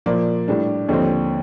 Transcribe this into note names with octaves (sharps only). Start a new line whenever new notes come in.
A#2 F3 A#3 D5
A2 G3 D4
D#2 D3 F3 C4 D#5